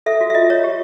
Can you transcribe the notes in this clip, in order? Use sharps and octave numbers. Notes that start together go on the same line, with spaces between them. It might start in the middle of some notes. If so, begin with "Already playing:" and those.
A4 E5
F#4
E5
F4 D#5
C#5
G4